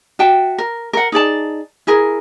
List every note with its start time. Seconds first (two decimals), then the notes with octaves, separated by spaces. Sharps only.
0.19 F#4 E5 G5 A5
0.58 A#4
0.93 A#4 F#5
1.12 D#4 G#4 D5 A5
1.87 E4 G#4 A#4